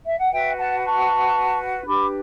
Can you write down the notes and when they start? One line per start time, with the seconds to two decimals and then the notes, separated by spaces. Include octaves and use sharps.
0.04 E5
0.16 F#5
0.30 F#4 B4 E5 G5
0.56 F#5 A5
0.83 A5 C#6
1.86 D4 G4 B4 B5 D6